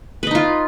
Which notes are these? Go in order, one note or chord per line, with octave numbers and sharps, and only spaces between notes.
D#4 F4 B4 D#5